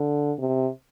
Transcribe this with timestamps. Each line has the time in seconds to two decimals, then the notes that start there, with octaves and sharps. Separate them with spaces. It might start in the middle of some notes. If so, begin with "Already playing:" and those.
Already playing: D3
0.39 C3